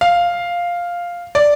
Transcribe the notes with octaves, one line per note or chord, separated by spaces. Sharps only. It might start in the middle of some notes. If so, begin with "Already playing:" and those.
F5
D5